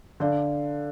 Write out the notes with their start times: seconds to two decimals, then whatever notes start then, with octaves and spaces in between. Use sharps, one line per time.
0.20 D3 D4 A4 D5 F5